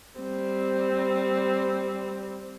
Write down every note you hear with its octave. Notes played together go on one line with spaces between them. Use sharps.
G3 C4